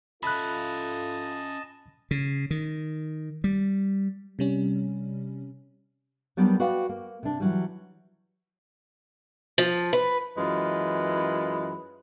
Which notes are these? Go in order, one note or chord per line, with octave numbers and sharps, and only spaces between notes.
C#4 F4 A4 D#5 E5 A5 B5 F#6
C#3
D#3
G3
C3 G3 C#4
F#3 G3 B3 D4 G4 A#4
F#4 B4 D5 F5 G5
A#3
C3 D4
E3 F#3 G3
F3
B4
F#2 E3 G#3 F4 B4